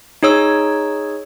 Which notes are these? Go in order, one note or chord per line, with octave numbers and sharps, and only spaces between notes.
D#4 G#4 C#5 E6